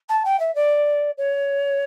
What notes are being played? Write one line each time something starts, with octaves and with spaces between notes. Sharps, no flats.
A5
G5
E5
D5
C#5